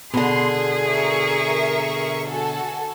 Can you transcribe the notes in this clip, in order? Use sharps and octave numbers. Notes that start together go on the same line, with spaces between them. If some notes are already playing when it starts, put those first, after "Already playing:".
B2 D3 G#4 C6
A#4 E5 C#6
F#4 A4 G#5